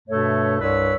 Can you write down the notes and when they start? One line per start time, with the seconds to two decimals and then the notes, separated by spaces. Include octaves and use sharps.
0.09 G2 B2 A3 A4 C#5 E5
0.60 C2 G2 B4 C#5 E6